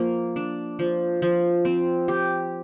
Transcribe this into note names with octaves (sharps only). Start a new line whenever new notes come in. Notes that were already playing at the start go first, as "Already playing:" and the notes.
Already playing: F3 A#3
D4
F3
F3
C4
G4